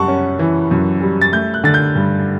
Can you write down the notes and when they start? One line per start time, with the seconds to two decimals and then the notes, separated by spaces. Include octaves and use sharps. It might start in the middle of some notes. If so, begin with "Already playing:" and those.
Already playing: F#2 G3 F#5 A5 C#6
0.08 C#4
0.39 E3
0.71 F#2
1.01 G3
1.21 A6
1.33 A3 G6
1.54 F#6
1.64 D3 A6
1.74 G6
1.95 G2